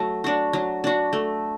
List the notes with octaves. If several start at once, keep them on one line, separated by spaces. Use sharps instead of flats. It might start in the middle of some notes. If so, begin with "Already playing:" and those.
Already playing: F#3 A3 A4
D4 F#4
F#3
D4 F#4
A3